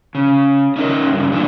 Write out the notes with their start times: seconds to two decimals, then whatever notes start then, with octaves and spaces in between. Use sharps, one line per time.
0.15 C#3
0.76 C#4 D#4 A4 A#4
1.12 G2 C#3
1.32 A#2 D3 E3 D4